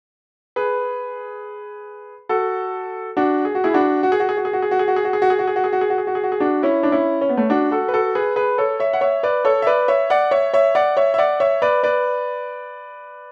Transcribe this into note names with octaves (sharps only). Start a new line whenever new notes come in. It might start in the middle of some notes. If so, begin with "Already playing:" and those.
G#4 B4
F#4 A4
D4 F#4
G#4
F#4
E4 G#4
D4 F#4
F#4
G#4
F#4
G#4
F#4
G#4
F#4
G#4
F#4
G#4
F#4
G#4
F#4
G#4
F#4
G#4
F#4
G#4
F#4
G#4
F#4
G#4
F#4
G#4
F#4
G#4
F#4
G#4
D4 F#4
C#4 E4
D4
C#4 E4
C#4
B3
A3 C#4
D4 F#4
F#4 A4
B4
F#4 A4
G#4 B4
G#4 B4
A4 C#5
C#5 E5
F#5
C#5 E5
B4 D5
A4 C#5
E5
B4 D5
C#5 E5
D5 F#5
C#5 E5
C#5 E5
D5 F#5
C#5 E5
E5
D5 F#5
C#5 E5
B4 D5
B4 D5